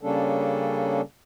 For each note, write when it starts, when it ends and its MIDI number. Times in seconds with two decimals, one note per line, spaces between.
0.01 1.01 49
0.01 1.01 55
0.01 1.01 58
0.01 1.01 61
0.01 1.01 62
0.01 1.01 69